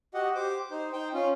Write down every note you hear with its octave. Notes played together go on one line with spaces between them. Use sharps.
F#4 G4 D#5 F#5
G4 C5 D6
D#4 C5
D#4 C5 G5
C#4 F4